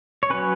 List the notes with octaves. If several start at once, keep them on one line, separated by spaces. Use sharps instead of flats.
C#5
F#3 C#4 B4